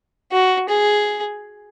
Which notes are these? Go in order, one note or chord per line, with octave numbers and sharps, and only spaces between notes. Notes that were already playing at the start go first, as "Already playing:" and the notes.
F#4
G#4